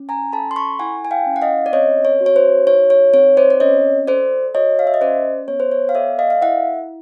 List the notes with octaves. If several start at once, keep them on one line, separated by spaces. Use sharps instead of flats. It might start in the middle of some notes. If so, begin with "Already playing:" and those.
Already playing: C#4
G#5 A#5
A4 A5 B5
C6
B5 C#6
E4 F#5 G#5
G#5
F5 G5
C#4
F#5
D#5 F5
D5
C4 C#5 D#5
C#5
F#4
C#5
C5
D#4 C#5
C#5
C4 C#5
C5 D5
D5
C#4 C#5 D#5
A4 C5 D5
F#4 C#5 D#5
F5
E5
D#5
C#4 C5 D5
B3 C#5
C5
C#5
F5
A4 D5 E5
D#5 F5
F5
E4 E5 F#5